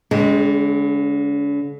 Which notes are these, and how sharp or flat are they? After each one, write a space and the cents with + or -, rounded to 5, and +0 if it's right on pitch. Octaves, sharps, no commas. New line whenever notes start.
D3 -45 G#3 +0 C4 +0